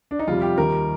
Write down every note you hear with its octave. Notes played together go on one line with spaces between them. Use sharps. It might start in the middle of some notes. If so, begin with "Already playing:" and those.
D4
D#4
F2 C3 G3 F4
G4
D#2 D#3 G3 A#4